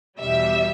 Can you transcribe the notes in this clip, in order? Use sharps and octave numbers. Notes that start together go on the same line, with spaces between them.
E2 B2 G3 E5